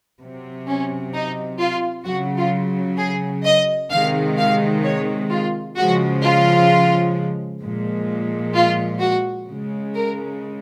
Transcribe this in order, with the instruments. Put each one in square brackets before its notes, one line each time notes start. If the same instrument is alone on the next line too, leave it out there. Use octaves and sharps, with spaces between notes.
[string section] C3 F#3
C#4
D#4
F4
C#3 F#3 F#4
F4
G#4
D#5
C3 D#3 G#3 F5
F5
C#5
F4
C#3 F3 G#3 F#4
F4
A#2 F3 G#3
F4
F#4
C#3
G#3
A#4